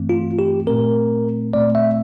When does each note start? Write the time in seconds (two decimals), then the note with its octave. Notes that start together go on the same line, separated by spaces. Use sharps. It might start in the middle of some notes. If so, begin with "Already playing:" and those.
Already playing: G2 E3 A3 C4
0.09 F4
0.39 G4
0.67 A#2 A3 C4 A#4
1.53 A#2 A3 C4 D5
1.75 E5